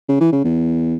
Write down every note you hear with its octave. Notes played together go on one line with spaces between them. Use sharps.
C#3
E3
C#3
E2